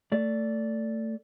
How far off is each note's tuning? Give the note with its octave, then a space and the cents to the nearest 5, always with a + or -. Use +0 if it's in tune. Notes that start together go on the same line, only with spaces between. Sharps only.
A3 +20 D5 -10